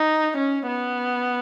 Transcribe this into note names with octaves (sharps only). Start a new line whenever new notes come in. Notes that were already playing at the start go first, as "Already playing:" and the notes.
Already playing: D#4
C#4
B3